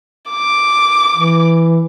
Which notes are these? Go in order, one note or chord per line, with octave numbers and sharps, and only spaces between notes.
D6
E3